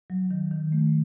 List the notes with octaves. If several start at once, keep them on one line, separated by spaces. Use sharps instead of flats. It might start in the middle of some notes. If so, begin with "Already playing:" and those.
F#3
D#3
D#3
A3